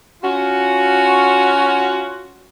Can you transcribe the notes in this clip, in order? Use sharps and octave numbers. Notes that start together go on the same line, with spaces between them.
C#4 F4 F#4